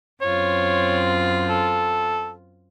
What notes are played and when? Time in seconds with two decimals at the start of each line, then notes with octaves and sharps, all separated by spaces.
0.22 F#2 C4 F4 C#5
1.49 A4